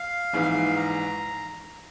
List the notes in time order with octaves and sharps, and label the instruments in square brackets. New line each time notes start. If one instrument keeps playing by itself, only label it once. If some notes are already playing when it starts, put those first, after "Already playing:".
Already playing: [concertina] F5
[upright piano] A#1 G#2 E3
[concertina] A#5